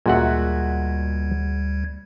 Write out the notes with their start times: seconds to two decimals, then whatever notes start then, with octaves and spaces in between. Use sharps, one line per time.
0.06 D2 A#2 G3 G#3 F#4 E5 F#5 G#6